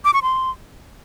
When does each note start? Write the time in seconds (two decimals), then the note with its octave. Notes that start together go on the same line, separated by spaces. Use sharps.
0.05 D6
0.14 C#6
0.23 C6